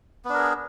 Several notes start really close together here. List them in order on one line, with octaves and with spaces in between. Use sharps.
B3 D4 A#4 G#4